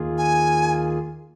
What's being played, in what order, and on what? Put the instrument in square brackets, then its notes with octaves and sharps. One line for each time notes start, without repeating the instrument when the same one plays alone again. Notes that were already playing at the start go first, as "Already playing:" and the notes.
Already playing: [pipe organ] D#2 D#3 A#3 F4 G#4
[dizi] G#5